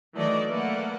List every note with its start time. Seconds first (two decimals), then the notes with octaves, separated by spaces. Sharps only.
0.15 D#3 E3 F#3 A3 D5 D#5
0.48 A3 A#3 B4 D5 F#5